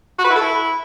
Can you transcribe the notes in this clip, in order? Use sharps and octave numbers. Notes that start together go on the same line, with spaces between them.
F#4
B4
E4
A4
E4